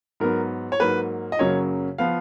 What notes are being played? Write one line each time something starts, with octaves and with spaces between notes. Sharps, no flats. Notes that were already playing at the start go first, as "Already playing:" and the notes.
G#2 F#3 B3 A#4
C#5
G#2 F#3 A#3 B4
D#5
F#2 C#3 F#3 A#3 C#4 C#5
F3 B3 F5